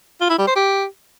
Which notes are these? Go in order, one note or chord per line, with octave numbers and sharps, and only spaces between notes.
F4
E4
G3
C5
G4